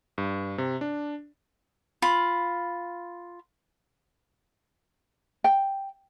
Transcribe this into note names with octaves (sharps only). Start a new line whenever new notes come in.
G2
C3
D4
F4 B5
G5